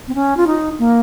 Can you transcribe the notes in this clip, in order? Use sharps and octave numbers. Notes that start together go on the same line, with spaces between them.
C4
C#4
F4
D#4
A#3